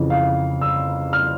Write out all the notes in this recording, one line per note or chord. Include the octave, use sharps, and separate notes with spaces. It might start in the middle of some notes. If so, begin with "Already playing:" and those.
Already playing: F2 C#3 E3
F5
E6
F6